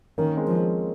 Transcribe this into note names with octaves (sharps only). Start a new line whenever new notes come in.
D#3 A#3 C#4
G#3 C4
F3
G#3 C4